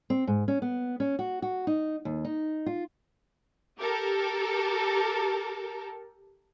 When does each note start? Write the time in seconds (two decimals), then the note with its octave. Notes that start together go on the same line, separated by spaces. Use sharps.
0.10 C4
0.27 G#2
0.48 C#4
0.62 B3
1.00 C#4
1.19 F#4
1.42 F#4
1.67 D#4
2.05 D#2
2.25 D#4
2.66 F4
3.78 G4 A4 A#4